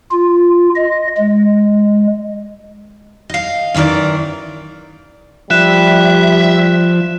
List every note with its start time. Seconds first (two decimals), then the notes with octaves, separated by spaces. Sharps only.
0.11 F4
0.76 D#5
1.17 G#3
3.29 D#5 F5
3.74 F#2 D#3 E3 A#4 D5
5.51 F3 G3 E5 F#6 E7